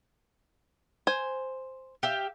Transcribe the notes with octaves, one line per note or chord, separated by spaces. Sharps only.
C5 G#5
G4 E5 F5